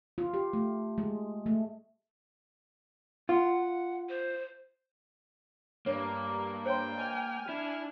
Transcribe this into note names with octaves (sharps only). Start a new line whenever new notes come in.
F4
G4
A3
G#3
A3
F4 F#5
C5
G2 A#3 C#5
C5 C#5 G5 C6
D#5 G#5 F6
D4 E4